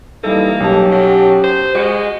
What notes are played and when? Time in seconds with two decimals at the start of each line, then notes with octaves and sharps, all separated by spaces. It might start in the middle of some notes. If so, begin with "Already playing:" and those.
0.24 E3 G3 A#3 D#4 A4
0.60 B1 C#4 G4 A5
0.92 F#3
1.44 C5
1.75 G#3 F#4 C#7